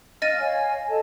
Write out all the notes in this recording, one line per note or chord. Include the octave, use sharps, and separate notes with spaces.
D#5 F5 F6 A6 D#7
C#5 F5 G#5
A4 D#5 A5